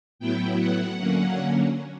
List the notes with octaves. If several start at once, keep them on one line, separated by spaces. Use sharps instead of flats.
A2 F#3 B3 E4 G5
F#5
D3 F#3 A#3 C#4